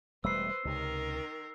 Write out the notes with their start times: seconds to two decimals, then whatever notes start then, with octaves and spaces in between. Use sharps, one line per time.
0.24 E1 G3 A3 B4 C5 E6 C7
0.65 C#2 C3 D#3 A#4